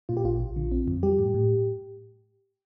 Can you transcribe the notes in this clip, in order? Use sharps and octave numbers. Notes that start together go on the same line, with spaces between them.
A#2 F4
G4
A#1 F4
A#1
D3
C4
F2
G3 G4
A2
A2